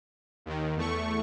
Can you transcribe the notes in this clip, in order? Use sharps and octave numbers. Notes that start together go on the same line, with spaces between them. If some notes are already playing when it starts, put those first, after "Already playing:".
D#2 D#3
E2 A3 C#6